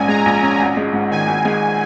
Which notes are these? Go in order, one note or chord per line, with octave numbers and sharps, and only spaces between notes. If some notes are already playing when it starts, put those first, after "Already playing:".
Already playing: A#1 G#2 C#4 G#5
G#3 A#5
A#1
C#4
G#1
G#3
G#2
D#3 G#5
G#1
G#3